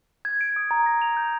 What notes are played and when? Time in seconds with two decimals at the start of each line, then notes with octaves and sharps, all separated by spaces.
0.25 G#6
0.41 D7
0.56 D#6
0.71 A#5
0.86 A#6
1.02 F7
1.17 G6